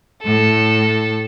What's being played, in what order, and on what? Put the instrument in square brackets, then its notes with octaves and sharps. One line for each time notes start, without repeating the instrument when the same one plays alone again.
[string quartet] A2 [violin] A4